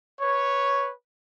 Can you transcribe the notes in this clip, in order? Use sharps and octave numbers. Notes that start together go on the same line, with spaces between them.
B4 C#5